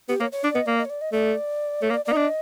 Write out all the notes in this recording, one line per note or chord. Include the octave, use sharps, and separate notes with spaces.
B3 G4
A#3 C#5
C#5
D4 D5
B3 D#5
A#3 D5
D#5
C#5
D5
D#5
A3 D5
A3 C#5
A#3
D5
A#3 D5
D#4
D4 D#5